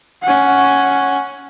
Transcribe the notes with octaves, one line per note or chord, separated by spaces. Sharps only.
C#4 F#5